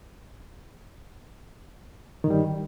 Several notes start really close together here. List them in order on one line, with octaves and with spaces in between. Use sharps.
D#3 G2 G3